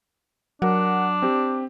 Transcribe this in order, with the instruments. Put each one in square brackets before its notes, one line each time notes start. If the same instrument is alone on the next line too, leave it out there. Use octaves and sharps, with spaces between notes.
[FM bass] F#3 [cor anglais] D4 [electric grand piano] A#4 F#5
[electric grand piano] C4 G4